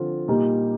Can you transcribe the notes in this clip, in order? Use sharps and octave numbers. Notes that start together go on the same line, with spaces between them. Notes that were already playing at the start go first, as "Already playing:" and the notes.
Already playing: D3 F3 C4 F4 A4
A#2 G3 A#3 D#4 G4